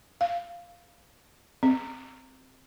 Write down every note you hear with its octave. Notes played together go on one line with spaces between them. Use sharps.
F5
C4